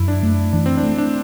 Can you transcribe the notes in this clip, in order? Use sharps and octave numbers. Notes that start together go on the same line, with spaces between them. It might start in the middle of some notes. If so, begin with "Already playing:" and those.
Already playing: F#2 E4
D4
A3
E3 D4
C4
D4
A3
D4